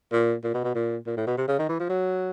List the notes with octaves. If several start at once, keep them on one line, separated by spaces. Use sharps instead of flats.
A#2
A#2
B2
B2
A#2
A#2
A2
B2
C3
C#3
D#3
E3
F3
F#3